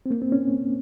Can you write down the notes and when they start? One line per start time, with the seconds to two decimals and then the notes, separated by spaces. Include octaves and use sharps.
0.06 C4
0.11 A#3
0.22 C4
0.32 C#4